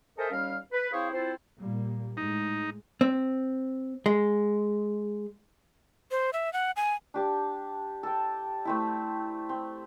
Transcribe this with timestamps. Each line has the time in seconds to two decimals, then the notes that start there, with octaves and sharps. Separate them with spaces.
0.18 A4 A#4 C5 D#5 E5 G#5
0.31 D#2 G3 C#4 F5
0.72 B4
0.92 C4 E4 G#4 C5 C#5 F5
1.13 C4 E4 F4 A4 C5
1.58 A#2 G3 A#3
2.17 A2 G#3 D#4
3.01 C4
4.06 G#3
6.11 C5
6.33 E5
6.53 F#5
6.76 G#5
7.14 D4 G4 A5
8.03 A4 G5
8.65 A3 C4 E4
9.49 C4